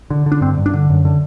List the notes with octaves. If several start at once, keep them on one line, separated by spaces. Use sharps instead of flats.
D3
D3
D4
G2 C4
G2
D4
D3
F#2
D3